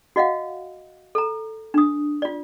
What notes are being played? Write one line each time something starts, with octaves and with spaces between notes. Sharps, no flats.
F#4 D#5 F5 F#5
A4 A#5
D4 D#6
F4 D5